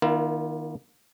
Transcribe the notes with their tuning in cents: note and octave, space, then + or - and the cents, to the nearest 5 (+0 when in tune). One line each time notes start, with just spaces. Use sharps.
D#3 +0 A#3 +35 F4 -45